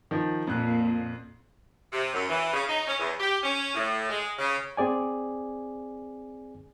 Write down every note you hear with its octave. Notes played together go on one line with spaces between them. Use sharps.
D#3 F3
F2 A#2 F#6
C3
F#2
E3
C#3
D#4
C#4
E2
G4
C#4
A2
G#3
C#3
C4 G#4 D5 G#5